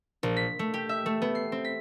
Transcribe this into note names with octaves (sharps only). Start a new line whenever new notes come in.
A#1
B6
A3
G4
E5
A3
B3
C7
C4
B6